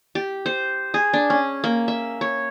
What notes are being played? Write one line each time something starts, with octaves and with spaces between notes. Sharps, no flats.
G4
C5
G#4
D4
C#4
A#3
E5
C#5